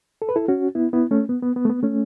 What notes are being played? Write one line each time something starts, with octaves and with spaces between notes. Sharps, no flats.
A4
B4
E4 A4
C#4 F#4
B3 E4
B3 E4
A3 C#4
B3
B3
B3
A3
B3
A3 C#4